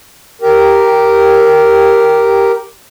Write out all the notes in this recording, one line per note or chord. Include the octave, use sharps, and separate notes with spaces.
G4 A#4